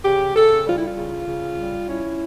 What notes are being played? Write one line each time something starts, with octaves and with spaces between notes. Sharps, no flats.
C#3 G4
C#3 A4
G3 F4
E4
F4
C#3
C#3
G3
C#4 E4